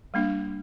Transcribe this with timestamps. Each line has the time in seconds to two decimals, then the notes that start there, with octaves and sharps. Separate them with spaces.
0.14 G3 A#3 D4